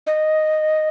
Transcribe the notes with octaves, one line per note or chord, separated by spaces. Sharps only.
D#5